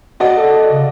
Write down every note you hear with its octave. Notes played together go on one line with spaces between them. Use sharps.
F#4 D5 D#5
A4
C#3